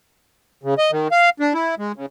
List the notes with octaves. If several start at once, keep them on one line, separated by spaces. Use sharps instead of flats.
C#3
D#5
D#3
F5
D4
E4
G#3
C#3